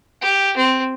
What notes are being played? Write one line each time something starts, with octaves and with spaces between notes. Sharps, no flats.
G4
C4